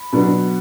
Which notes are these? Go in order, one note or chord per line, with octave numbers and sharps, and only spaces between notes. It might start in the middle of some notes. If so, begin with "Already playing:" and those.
Already playing: B5
B2 F#3 B3 D4